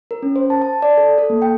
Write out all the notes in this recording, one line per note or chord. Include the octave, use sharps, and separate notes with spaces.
A#4
C#4
C5
A5
A5
D5
A4
A4
A#3
G5